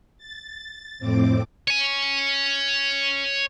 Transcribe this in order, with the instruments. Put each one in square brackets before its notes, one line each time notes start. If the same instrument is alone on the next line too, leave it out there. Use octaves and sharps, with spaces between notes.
[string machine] A6
F2 A2 C4 D6
[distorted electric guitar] C#5 G#5